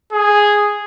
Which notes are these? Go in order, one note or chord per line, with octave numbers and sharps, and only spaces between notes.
G#4